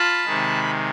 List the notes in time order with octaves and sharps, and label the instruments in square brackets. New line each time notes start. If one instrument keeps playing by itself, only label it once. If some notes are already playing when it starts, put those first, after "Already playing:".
Already playing: [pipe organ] F4 A5 B5
C3 D#3 G#3